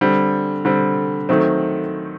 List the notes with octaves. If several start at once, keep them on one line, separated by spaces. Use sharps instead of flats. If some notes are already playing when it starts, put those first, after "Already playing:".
D3 G3 C4
D3 G3 C4
D#3 F#3 A3 C4